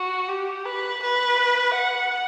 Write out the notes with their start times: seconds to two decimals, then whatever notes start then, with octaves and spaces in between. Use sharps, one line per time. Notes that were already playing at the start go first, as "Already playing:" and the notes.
Already playing: F#4
0.28 G4
0.66 B4
1.02 B4
1.76 F#5